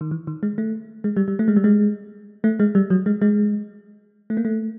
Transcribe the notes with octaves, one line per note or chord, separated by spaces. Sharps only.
D#3
E3
D#3
G#3
A3
G#3
G3
G3
A3
G#3
G3
G#3
A3
G#3
G3
F#3
G#3
G#3
A3
A#3
A3